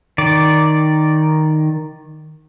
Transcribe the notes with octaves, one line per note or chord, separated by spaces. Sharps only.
D#3 D5